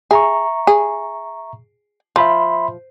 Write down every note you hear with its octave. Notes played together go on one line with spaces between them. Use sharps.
G#4 E5 A#5 C#6
G#4
F3 E5 B5 C6